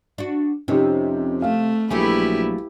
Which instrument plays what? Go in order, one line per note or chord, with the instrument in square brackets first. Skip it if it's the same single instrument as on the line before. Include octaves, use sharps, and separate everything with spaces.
[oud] D4 F#4
[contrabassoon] F2 [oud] C3 [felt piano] C#4 D#4 G4
[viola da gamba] A3 [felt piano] F5
[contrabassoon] A#1 [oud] F#3 A3 G#4 [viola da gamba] E4 G4 B4